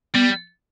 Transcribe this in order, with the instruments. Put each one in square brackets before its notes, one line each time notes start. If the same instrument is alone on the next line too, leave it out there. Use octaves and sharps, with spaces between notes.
[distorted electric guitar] G3 [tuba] B3